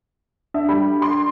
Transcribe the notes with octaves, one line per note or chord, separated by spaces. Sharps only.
D4 E5
G3 B5
C6